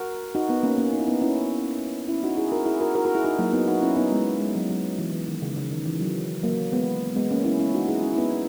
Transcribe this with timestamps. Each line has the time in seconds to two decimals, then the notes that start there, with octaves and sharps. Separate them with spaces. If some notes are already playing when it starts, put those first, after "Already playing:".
Already playing: F#4 A#4
0.35 D#4 F#4
0.49 B3 D#4
0.63 A#3 C#4
0.77 A#3 C#4
0.93 D#4
1.00 E4
1.07 B3 D#4
1.21 C#4 E4
2.08 C#4 E4
2.23 D#4 F#4
2.37 E4 G#4
2.52 F#4 A#4
2.66 E4 G#4
2.81 F#4 A#4
2.95 F#4 A#4
3.05 F#4 A#4
3.14 E4 G#4
3.25 D#4 F#4
3.39 F#3 A#3
3.53 B3 D#4
3.68 D#4 F#4
3.82 C#4 E4
3.96 B3 D#4
4.12 G#3 B3
4.40 G#3
4.55 F#3
4.69 F#3
4.98 E3
5.13 E3
5.28 D#3
5.42 C#3
5.57 C#3
5.71 D#3
5.86 E3
6.01 F#3
6.43 F#3 A#3
6.72 G#3 B3
7.16 G#3 B3
7.31 A#3 C#4
7.45 C#4 E4
7.59 C#4 E4
7.74 D#4 F#4
7.88 E4 G#4
8.03 C#4 E4
8.14 E4
8.18 B3 D#4